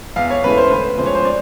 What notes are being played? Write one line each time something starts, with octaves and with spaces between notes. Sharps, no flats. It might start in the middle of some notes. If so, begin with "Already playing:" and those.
E2 F5
C#5
C#3 E3 A3 B4
C5
D2 B4
C#3 F3 G#3 C5
C#5
C5
D5